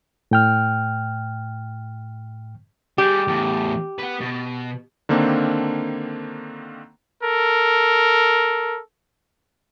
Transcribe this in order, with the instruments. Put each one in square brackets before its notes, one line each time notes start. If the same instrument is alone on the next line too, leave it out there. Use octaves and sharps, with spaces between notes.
[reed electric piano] A2 G5 F6
[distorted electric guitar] G3 G#4 [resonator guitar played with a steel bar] G4
[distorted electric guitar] E2 A2
B4 F#5
B2
[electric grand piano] D3 D#3 A#3 C4 D4
[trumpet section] A4 A#4